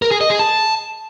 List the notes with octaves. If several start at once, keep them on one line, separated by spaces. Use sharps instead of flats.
A#4
G#4
D#5
G#4
A5